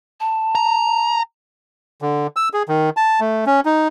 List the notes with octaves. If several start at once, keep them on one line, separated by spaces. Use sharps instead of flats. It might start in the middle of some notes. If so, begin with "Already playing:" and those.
A5
A#5
D3
E6
G#4
D#3
A5
A3
C#4
D#4